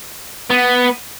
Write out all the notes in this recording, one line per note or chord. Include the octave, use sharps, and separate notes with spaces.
B3